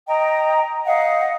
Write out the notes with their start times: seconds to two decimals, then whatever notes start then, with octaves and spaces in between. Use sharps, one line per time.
0.08 D#5 G5 A#5
0.86 D#5 F5 F#5